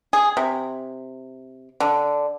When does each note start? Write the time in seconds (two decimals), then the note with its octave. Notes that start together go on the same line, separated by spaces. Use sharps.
0.13 G#4
0.37 C3
1.80 D3